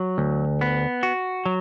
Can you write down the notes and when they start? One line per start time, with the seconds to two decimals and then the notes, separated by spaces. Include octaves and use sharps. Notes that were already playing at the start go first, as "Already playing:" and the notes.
Already playing: F#3
0.18 D2
0.61 B3
1.03 F#4
1.46 F#3